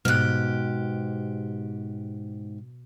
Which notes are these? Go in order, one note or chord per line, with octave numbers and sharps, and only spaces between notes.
G#2 B2 G4 F6 F#6